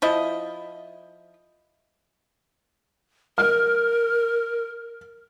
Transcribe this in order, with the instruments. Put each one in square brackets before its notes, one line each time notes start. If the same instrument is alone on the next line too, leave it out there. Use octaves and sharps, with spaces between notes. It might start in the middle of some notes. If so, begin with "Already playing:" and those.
[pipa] F3 E4 D#5
[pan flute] A#4 [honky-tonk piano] F6